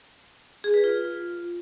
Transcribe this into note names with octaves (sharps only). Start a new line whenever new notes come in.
G#4
B4
F4